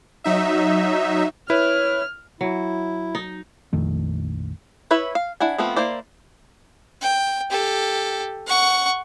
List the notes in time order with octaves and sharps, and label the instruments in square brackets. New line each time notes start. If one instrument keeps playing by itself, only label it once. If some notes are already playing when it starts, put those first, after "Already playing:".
[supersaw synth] F#3 D#4 E5
[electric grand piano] E4 B4 [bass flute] C#5 [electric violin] F6
[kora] F#3 [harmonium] E4
[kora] D#4
[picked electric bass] A#1 F2 D#3 A3
[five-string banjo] E4 B4 C#5 E5
F5
D4 E4 F#5 G#5
F3 A3 B3 C4 F4
A#3 E4 C5 D5
[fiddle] G5
G4 A4
F#5 C#6